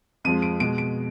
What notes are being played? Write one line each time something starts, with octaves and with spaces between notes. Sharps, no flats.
F2 F3 G#3 D#7
D7
B2 G#3 D7
D7